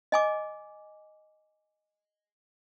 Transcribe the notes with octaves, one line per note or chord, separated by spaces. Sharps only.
D#5 G#5 D6